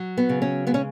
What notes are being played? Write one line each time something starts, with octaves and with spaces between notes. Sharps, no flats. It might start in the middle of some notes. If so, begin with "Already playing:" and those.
Already playing: F#3
B3
C#3
C#4
G#3 B3
C#4